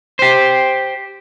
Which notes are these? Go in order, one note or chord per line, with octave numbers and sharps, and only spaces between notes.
G4 C5